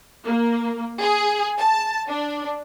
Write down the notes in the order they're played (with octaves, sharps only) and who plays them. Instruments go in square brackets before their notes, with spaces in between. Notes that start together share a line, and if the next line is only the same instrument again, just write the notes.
[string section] A#3
G#4
A5
D4